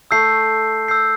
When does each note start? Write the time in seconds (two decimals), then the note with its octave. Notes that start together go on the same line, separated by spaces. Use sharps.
0.11 A3 E6 G6 C7
0.88 E6 G6 C7